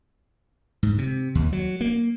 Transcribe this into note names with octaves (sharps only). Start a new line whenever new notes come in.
G#2
C3
D#2
F#3
A#3